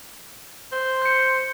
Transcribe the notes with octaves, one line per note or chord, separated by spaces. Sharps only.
C5
G6 C#7